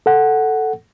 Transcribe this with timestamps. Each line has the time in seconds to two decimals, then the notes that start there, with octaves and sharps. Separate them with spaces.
0.06 A4 F#5